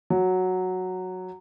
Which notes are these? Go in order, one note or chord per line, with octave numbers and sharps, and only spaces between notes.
F#3